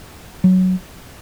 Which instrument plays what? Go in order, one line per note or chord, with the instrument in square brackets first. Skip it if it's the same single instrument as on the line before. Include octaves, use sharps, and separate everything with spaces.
[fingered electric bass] F#3